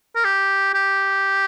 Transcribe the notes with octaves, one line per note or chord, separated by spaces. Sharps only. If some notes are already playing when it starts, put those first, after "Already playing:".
A#4
G4
G4